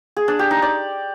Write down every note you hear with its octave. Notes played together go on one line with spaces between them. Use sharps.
G#4
D4
G4
D#4
D5